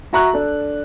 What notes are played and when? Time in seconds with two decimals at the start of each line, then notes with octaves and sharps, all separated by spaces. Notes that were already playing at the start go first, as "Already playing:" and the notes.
0.13 F#4 E5 A#5 C#6 F#6
0.33 D4 A4